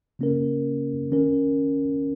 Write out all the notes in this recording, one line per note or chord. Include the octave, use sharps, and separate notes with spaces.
C#3 A#3 C#4 A#4
D#3 C#4 A#4